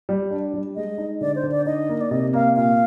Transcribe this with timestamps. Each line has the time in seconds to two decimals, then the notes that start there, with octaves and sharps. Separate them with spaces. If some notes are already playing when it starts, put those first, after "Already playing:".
0.09 G3
0.31 D4
0.54 G3
0.76 G#3 D#5
0.98 D#4
1.21 D3 D5
1.36 C5
1.43 D3
1.51 D5
1.66 D#4 D#5
1.89 A#3
2.01 D5
2.11 C3 D#5
2.33 A#3 F5
2.56 A#2 F5